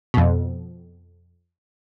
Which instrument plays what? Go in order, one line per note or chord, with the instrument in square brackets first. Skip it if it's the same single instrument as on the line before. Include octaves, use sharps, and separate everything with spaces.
[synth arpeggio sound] F2 B2